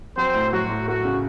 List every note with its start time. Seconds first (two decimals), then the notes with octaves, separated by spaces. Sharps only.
0.17 F#3 C4 C5
0.34 A2
0.52 F#3 F#4
0.69 A2
0.87 A3 F#4
1.05 C#3